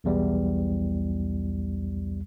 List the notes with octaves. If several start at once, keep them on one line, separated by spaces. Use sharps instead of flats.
B1 E2 G3